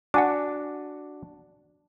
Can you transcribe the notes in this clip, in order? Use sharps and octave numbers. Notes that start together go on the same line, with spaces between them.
D4 F#4 F#5 G#5 D6